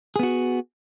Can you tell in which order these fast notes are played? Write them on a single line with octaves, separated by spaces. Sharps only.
G#4 B3 F#4